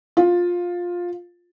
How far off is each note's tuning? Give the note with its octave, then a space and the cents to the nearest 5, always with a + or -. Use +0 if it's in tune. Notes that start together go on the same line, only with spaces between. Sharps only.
F4 +10